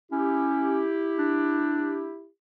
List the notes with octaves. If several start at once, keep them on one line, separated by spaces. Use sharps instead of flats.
C#4 E4 G4
D4